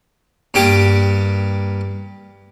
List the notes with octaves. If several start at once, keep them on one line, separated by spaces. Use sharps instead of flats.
G2 A#3 G4 D6 D#6